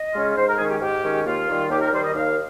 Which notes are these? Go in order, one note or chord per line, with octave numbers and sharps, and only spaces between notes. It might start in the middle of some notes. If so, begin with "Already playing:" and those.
Already playing: D#5
C#3 G#3 C#4 F4
G#2 C5
A#4
D#3 G#3 C#4 G#4
G4
G#2 G4
D#3 G#3 C#4
D#2 F4
D#3 G3
D#2 G4
A#4
D#3 G3 C5
D#5
D#2 F5